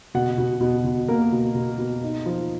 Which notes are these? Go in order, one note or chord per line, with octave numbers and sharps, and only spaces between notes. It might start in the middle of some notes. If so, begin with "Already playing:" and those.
B2 F#5
B2
B2
B2
A#3 A#4
B2
B2
B2
D#4
F3